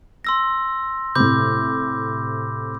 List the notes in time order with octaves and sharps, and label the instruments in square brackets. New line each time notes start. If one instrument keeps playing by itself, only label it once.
[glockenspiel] C6 E6 A#6
[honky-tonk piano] A2 C3 [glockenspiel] B5 D6 G6